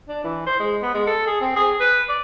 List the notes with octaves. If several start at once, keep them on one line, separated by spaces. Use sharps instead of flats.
D4
E3
C5
G#3
B3
G#3
A4
G#4
C4
G#4
B4
D5